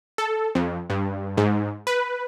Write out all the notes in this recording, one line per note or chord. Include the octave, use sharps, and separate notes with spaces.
A4
F2
G2
G#2
B4